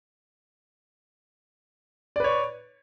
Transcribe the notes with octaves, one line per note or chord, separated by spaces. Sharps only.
B4 C#5 D5